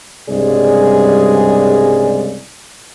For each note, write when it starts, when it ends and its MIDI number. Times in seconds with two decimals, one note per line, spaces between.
0.29 2.39 36
0.29 2.39 43
0.29 2.39 49
0.29 2.39 56
0.29 2.39 68
0.29 2.39 74